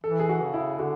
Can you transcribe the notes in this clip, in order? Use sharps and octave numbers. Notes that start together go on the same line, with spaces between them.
E3 A4
G#4
F#4
C#3
E4
D3 F#4